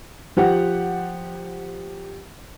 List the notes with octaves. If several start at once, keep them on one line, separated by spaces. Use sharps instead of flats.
F3 G4 F#5